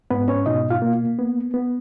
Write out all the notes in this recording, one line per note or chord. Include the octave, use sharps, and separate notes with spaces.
G#2 B3 B4
C#4 C#5
B2 D#4 D#5
F4 F5
A#3
B3
B3